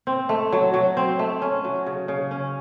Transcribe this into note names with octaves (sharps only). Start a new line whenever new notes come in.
C4
A3
F#3
F#3
C4
A3
C#4
F#3
C#3
C#3
C#4